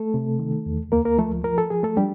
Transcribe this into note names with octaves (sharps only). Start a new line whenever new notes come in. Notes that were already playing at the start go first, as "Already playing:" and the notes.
Already playing: A3 A4
C3
D#3
E2
D2 A#3 A#4
A#3 A#4
F3 A3 A4
F3 A#4
A4
F3 G#4
A3 A4
G3 D4 G4